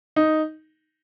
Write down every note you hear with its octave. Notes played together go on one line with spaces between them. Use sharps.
D#4